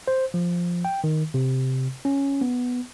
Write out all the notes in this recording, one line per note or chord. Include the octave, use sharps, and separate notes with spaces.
C5
F3
G5
D#3
C3
C#4
B3